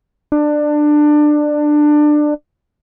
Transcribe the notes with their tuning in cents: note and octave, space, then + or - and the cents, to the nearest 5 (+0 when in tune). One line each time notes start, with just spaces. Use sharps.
D4 +20